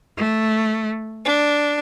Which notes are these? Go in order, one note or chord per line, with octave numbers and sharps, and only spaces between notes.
A3
D4